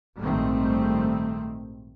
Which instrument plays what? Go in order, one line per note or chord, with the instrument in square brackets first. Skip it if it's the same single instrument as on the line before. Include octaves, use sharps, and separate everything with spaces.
[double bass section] A#1 G#2 D#3 G3 A3 C4